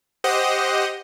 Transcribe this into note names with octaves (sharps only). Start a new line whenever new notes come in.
G4 C5 D#5 F#5